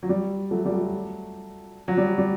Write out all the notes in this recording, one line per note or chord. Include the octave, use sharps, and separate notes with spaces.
F#3
G3
F#3 A3
G3
F#3 A3
F#3
G3
G3